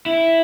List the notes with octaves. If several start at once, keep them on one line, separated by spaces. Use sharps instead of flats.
E4